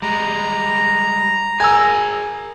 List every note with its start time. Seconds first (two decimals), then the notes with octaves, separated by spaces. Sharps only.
0.02 G3 G#3 A#5
1.60 G#4 A#4 G#5 E6